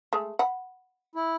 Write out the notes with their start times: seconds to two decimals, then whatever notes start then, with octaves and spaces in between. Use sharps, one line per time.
0.13 G#3 A3
0.39 F#5 B5
1.16 E4